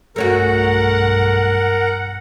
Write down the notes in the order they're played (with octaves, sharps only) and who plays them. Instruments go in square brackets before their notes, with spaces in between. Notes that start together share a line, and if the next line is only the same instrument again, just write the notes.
[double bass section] B1 G2 [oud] A3 C#4 F#4 [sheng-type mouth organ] A#4 [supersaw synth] F#5